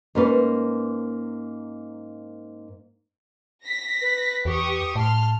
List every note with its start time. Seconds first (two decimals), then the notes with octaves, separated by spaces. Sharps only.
0.15 G#2 A#3 C#4 B4
3.64 A#6 B6
4.01 B4
4.45 E2 G4 C#6 D#6
4.96 A2 A5 C6 F6